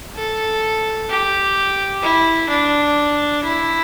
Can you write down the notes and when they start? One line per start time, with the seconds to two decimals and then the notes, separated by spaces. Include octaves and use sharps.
0.16 A4
1.09 G4
2.02 E4
2.49 D4
3.43 E4